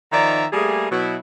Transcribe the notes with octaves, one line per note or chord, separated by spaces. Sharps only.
D#3 F3 D#4 D5 E5 A#5
G3 A3 A#3 G#4
B2 F#3 E4